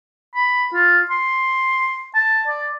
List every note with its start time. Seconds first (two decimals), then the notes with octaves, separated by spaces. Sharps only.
0.35 B5
0.74 F4
1.11 C6
2.15 A5
2.48 D5